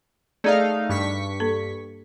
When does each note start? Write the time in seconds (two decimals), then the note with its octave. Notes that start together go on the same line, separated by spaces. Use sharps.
0.44 A3 D#4 G#4 D5 F5 G#6
0.89 G2 C#6 B6
1.40 A#3 A4